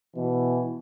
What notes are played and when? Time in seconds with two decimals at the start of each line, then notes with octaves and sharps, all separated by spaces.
0.15 B2 E3